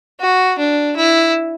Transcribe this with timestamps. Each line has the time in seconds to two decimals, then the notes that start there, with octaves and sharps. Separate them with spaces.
0.20 F#4
0.59 D4
0.97 E4